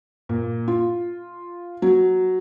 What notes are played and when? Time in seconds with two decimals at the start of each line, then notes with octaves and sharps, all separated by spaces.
0.29 A#2
0.68 F4
1.82 F#3